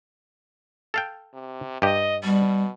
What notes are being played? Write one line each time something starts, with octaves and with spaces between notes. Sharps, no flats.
A4 F5 G5
C3
G2 G4 D#5
B2 G3